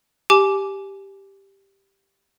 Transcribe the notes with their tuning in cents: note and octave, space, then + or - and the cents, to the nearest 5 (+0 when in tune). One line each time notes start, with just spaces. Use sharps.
G4 +0 G#5 +30 D6 -5